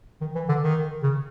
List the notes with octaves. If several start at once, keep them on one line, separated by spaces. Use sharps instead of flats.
D#3
E3
D3
D#3
C#3